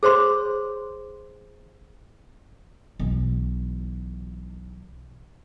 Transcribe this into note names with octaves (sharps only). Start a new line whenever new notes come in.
G#4 C5 C#5 C6
B1 E3